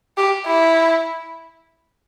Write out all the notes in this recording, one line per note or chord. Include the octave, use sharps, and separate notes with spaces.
G4
E4